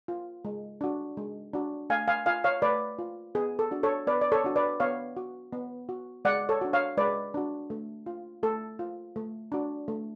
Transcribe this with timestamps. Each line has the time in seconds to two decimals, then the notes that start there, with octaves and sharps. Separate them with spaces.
0.08 F4
0.45 G#3
0.81 D4 F#4
1.17 G#3
1.53 D4 F#4
1.90 A3 F5 G#5
2.08 F5 G#5
2.26 F4 F5 G#5
2.44 C#5 F5
2.62 A3 B4 D5
2.99 F4
3.35 B3 G#4
3.59 A4
3.71 D4 F#4
3.83 A4 C#5
4.07 B3 B4 D5
4.21 D5
4.32 A4 C#5
4.44 D4 F#4
4.56 B4 D5
4.80 B3 C#5 F5
5.17 F#4
5.53 B3
5.89 F#4
6.25 G#3 D5 F#5
6.49 A4 C#5
6.61 D4 F#4
6.73 C#5 F5
6.97 G#3 B4 D5
7.34 D4 F#4
7.70 A3
8.06 F4
8.43 A3 A4
8.79 F4
9.16 A3
9.52 D4 F#4
9.88 A3